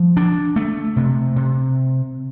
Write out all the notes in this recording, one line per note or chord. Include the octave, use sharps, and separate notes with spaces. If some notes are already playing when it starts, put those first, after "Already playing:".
Already playing: F3
D4
A3
C3
C3